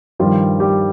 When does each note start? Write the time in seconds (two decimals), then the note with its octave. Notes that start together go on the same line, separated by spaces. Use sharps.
0.19 G2 D#3 F3 G3 F4
0.60 G3 G4